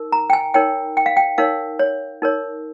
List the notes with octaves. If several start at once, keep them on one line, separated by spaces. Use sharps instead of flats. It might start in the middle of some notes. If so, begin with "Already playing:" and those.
Already playing: D#4 A#4
A#5
G5
G#5
D#4 A#4 C#5 G5
G5
F5
G5
D#4 A#4 C#5 F5
C#5
D#4 A#4 C#5